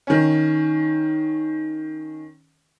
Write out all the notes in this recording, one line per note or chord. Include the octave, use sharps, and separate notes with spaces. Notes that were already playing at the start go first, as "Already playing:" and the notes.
D#3 C#4